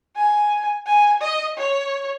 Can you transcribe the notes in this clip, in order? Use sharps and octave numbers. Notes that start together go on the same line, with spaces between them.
G#5
G#5
D#5
C#5